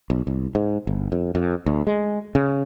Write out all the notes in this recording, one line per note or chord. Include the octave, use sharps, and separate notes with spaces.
B1
C2
G#2
G1
F2
F2
D2
G#3
C#3